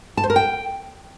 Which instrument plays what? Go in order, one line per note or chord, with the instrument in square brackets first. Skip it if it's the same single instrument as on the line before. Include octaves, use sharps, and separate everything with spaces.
[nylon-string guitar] A5
C5
A#4
G5